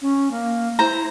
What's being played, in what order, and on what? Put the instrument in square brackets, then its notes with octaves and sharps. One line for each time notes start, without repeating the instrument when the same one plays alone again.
[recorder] C#4
A#3
[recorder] E4 [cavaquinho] C5 A#5